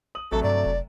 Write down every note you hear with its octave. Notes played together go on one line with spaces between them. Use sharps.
D#6 F#7
A1 C3 F#3 A3 A4
G2 D5
F1